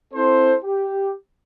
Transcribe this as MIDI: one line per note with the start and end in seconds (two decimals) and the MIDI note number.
0.14 0.55 60
0.14 0.55 64
0.14 0.55 69
0.14 0.55 72
0.65 1.13 67